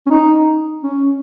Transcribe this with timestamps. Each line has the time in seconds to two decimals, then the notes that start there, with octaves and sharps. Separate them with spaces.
0.06 C#4
0.10 D#4
0.83 C#4